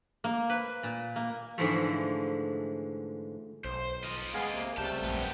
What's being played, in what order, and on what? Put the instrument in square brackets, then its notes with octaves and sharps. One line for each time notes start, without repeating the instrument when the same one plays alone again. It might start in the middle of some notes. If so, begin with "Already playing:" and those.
[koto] A#3
B4
A#2
A#3
[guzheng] G#2 D3 E3 F3 G#3 A3
[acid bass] B1 [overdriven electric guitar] C5
[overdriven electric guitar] F4 D#5
[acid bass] G#3 [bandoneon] B3 G#4 F5
[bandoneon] C3 A#3
[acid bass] C#2 [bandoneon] C3 G3 G6 [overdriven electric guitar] A3 A5
[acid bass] A#1 [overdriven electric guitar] F#2 B3